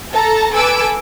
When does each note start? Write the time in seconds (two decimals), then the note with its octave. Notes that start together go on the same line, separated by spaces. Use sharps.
0.13 A4 A5 A#5
0.52 A4 B4 G#5 D6 E6